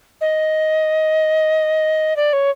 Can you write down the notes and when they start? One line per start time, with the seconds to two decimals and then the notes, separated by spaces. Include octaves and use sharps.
0.21 D#5
2.16 D5
2.33 C#5